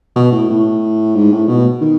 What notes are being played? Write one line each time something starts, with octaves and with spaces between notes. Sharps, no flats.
B2
A2
A2
G#2
A2
B2
D#3